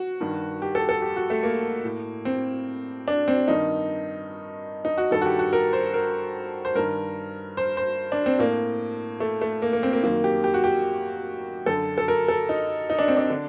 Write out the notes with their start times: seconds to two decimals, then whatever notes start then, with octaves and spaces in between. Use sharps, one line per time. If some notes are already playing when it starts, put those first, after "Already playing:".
Already playing: F#4
0.20 G2 D#3
0.62 G4
0.75 A4
0.89 A4
1.02 G4
1.16 F#4
1.30 A3
1.43 A#3
1.84 A2
2.25 C4
3.08 D4
3.28 C4
3.48 G2 D#3 D#4
4.85 D#4
4.98 F#4
5.11 G2 D#3 A4
5.21 F#4
5.26 G4
5.39 F#4
5.53 A#4
5.73 C5
5.94 A#4
6.65 C5
6.75 G2 D#3 A#4
7.57 C5
7.77 C5
8.12 D4
8.26 C4
8.39 A2 A#3
9.20 A3
9.41 A3
9.62 A#3
9.73 A#3
9.83 C4
9.93 A#3
10.03 F#2 D#3 A#3
10.24 G4
10.44 G4
10.54 F#4
10.64 G4
11.66 F#2 D3 A4
11.98 A4
12.08 A#4
12.28 A4
12.49 D#4
12.90 D#4
12.99 D4
13.08 C4
13.17 D4
13.30 D3